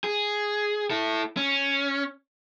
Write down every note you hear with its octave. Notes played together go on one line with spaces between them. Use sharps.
G#4
E4 A4
C#4